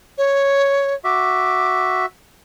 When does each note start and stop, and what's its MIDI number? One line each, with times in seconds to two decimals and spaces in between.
0.18 0.95 73
1.04 2.06 66
1.04 2.06 76
1.04 2.03 86